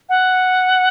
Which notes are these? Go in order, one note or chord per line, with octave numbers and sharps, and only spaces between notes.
F#5